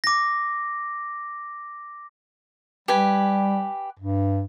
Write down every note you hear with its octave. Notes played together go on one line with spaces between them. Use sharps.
D6 A#6
G3 G4 B4 G#5
G2